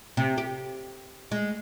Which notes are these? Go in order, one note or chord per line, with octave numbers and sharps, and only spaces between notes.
C3
G4
G#3